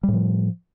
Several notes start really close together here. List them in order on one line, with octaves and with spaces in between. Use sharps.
G3 A2 F3